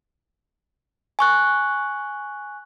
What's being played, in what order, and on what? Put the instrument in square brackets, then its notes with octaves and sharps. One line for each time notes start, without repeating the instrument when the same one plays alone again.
[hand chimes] G#5 C#6 F#6